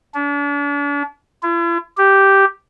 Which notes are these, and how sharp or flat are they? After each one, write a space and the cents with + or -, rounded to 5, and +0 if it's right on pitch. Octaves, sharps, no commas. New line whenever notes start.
D4 -40
E4 +45
G4 -5